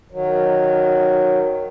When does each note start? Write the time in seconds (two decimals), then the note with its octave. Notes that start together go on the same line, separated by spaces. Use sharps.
0.12 D#3 F#3